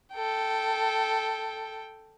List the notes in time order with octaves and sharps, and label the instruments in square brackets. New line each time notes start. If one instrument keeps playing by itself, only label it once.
[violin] A4 G5